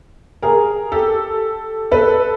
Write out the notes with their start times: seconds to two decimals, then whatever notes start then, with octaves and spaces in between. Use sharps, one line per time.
0.42 G#4 A#4
0.92 G4 A4
1.91 A4 B4